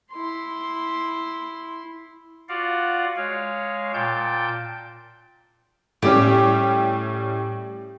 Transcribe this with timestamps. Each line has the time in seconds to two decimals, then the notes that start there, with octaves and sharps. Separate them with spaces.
0.12 E4 C6
2.49 F4 F#4 D5 F5 F#5
3.16 G#3 C#5 F5
3.94 A#2 G5 A5 G6
6.02 A2 G3 C#4 G4